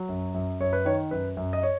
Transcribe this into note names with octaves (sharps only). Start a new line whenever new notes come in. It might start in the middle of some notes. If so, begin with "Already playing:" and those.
Already playing: F#3
F#2
F#2
F#2 C#5
B4
D#3 C#5
F#2 B4
F#2
D#5
C#5